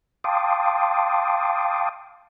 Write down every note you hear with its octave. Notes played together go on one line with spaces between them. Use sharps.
F5 G5 A5 C6 D6 D#6